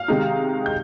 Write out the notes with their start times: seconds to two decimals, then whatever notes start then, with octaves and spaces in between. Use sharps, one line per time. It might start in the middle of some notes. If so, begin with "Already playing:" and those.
Already playing: F5 F6
0.08 C3 D#3 G#3 D#4
0.66 G6